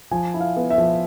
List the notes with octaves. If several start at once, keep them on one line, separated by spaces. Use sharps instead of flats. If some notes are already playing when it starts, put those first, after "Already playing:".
F3 G#5
E4
F5
B3
E5
F3